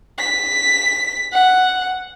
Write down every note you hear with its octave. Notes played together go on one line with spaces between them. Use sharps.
B6
F#5